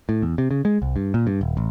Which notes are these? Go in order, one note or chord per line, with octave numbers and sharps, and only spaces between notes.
A2
E2
C3
C#3
G#3
C2
G2
A#2
G2
D#1
A1